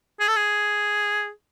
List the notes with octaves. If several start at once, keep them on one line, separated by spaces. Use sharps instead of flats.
G#4
A4
G#4